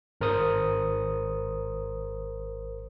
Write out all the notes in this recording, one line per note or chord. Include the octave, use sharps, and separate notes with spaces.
G#1 A#4 C5 D#6